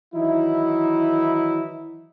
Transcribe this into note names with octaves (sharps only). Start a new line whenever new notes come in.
D#3 E3 F#3 D#4 E4